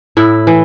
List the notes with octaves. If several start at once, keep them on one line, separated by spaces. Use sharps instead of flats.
A2 E4
E3